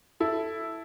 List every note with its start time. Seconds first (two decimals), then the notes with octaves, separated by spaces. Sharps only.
0.20 E4 A4